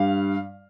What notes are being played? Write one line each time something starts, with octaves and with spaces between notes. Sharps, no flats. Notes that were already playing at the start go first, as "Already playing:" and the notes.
Already playing: G2 G3 F5